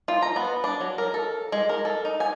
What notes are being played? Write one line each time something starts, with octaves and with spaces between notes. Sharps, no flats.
F4
A#5
B3
D4
F#3
A#4
A4
G#3
A#4
A4
D#4
G#5